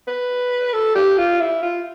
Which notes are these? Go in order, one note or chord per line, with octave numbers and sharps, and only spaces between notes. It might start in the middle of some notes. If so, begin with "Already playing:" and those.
B4
A4
G4
F4
E4
F4